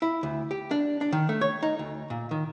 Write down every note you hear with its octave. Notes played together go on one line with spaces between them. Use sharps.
E4
D2
G4
D4
D4
D#3
A3
C#5
D#4
D2
A#2
D#3